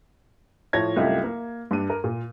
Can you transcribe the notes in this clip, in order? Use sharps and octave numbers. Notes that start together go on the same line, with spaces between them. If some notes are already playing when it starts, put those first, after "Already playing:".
A2 F3 C#5 A5 G#6 A#6
C2 F#2 A3 F4 G4 D#5
A#3
G2 D4 D#7
A#4
A#2